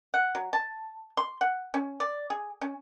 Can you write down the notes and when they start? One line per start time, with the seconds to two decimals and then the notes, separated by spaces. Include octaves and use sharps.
0.14 F#5
0.35 F#3
0.53 A5
1.17 C6
1.41 F#5
1.74 C#4
2.00 D5
2.30 G#4
2.61 C#4